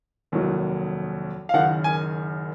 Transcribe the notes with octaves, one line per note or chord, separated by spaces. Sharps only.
F1 D#2 D#3 F#3
F5
F#1 F#2 D#3 F#5
G#5